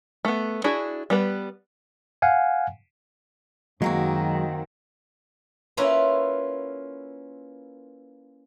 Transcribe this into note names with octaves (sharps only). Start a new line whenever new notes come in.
A3 B3
D4 E4 F#4 G#4
G3 B3 B4
F5 F#5 G#5
F#2 D#3 F#3 G#3 A#3 C4 F#4
A#3 C#4 E4 F4 A#4 B4